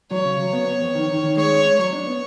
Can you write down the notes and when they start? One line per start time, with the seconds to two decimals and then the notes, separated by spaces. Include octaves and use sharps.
0.11 F#3 C#5
0.25 C#3
0.40 F#3
0.53 B3
0.67 B3
0.81 F2
0.95 D#3
1.09 D#3
1.23 D#3
1.37 G#3 C#5
1.51 C#4
1.65 C#4
1.79 F#3 C#5
1.93 D4
2.07 B3